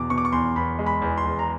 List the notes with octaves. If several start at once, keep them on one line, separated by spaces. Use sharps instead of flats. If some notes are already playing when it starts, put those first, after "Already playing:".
Already playing: E2 B2 D6
B2 C#6
D6
C#6
E2 C6
E2 B5
G#3
B5
E2
C6
E2
A#5